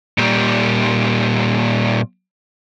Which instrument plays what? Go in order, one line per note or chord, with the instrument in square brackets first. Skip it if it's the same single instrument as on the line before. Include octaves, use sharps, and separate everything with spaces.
[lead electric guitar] A#2 G3